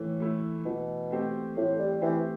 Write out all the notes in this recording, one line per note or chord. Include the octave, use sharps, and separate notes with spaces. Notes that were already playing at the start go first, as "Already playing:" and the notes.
Already playing: A2 E3 A3
A3 E4
B2 E3
A3 C4 G4 C5
A2 E3
G3
E3 A3 C4 G4 C5